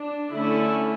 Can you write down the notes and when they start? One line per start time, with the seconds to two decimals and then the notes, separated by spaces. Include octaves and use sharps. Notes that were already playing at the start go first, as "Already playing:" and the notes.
Already playing: D4
0.32 D3 A3 C#4 E4